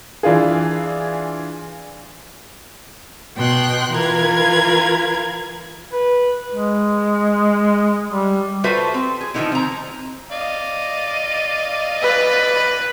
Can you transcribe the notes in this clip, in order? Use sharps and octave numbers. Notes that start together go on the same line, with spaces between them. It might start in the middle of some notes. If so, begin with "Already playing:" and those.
E3 D4 F4 G#4
B2 G5 C6 F#6
E3 F4 A#4 B4 G#6
B4
G#3
G3
F4 F#4 A4 B4 C5 E5
C4
G#4
D#3 F3 A3 A#3 D#4 E4
C4 A#5
D5 D#5 F5
B4